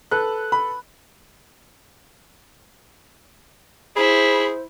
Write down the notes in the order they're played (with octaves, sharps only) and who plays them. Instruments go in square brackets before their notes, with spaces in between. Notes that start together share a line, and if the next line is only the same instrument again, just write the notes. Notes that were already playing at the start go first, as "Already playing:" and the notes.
[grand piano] A4 B4 F#6
[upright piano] B5
[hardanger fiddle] E4 [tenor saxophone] G#4 [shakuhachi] C5 [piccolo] B5